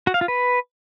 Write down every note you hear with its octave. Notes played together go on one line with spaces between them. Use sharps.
F#4
F5
F4
B4